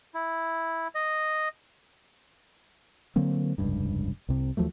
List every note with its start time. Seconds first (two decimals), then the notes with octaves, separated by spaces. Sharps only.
0.14 E4
0.95 D#5
3.16 D3 F#3 A#3 C4
3.58 F1 C#2 G2
4.29 C2 C3
4.57 D#2 F3 F#3 A3